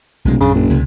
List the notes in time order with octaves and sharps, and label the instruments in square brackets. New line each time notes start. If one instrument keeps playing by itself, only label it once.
[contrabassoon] D1 [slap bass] B1 C3 G#3
[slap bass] A#1 F#2 D4 [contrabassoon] C#3
[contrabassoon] F#1
[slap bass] C#2 C3